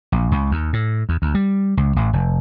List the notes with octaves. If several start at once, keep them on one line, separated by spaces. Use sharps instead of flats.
A#1
C#2
D#2
A2
E2
D2
G3
C#2
A1
F1